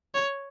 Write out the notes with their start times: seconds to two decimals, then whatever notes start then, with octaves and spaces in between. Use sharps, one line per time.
0.15 C#5